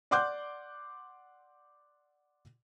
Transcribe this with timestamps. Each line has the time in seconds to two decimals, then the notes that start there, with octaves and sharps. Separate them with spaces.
0.11 D5 F#5 C6 D6 F#6 G6